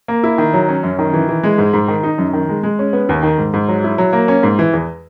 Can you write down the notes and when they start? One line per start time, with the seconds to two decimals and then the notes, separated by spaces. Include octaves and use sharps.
0.08 A#3
0.24 E4
0.38 D#3
0.53 F#3
0.69 C#4
0.83 F#2
0.99 D#3
1.14 E3
1.29 E3
1.43 G#3
1.58 G#2
1.73 G#2
1.88 D#3
2.03 D#4
2.18 F#2
2.33 D#3
2.49 G#3
2.63 G#3
2.79 C#4
2.93 B3
3.09 D#2
3.23 D#3
3.38 G#2
3.54 G#2
3.68 F#3
3.84 E4
3.98 F#3
4.13 A#3
4.28 C#4
4.43 G#2
4.59 E3
4.73 E2